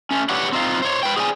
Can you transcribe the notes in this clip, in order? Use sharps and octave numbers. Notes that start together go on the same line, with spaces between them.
A3 C#4
G4 B4 C#5 D5 F#5
C4 D#4 F4
C5 C#5
B4 G5
G#4 C5 D5 F5 G#5